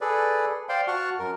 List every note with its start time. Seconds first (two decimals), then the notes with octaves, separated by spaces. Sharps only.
0.01 G#4 A4 B4 D5
0.69 C5 D5 F5 G5 C6
0.88 F#4 F#5 A5 C#6 F6
1.19 F#2 A#4